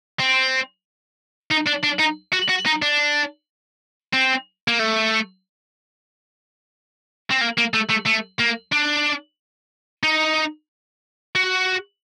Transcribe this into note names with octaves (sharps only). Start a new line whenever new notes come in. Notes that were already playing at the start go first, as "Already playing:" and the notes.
C4
D#4
D4
D4
D#4
F#4
F#4
D#4
D4
C4
A#3
A3
C4
A#3
A#3
A3
A3
A3
A#3
D4
D#4
F#4